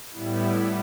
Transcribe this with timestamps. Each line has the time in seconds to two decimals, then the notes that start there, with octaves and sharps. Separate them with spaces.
0.11 A2 G3 B3 E4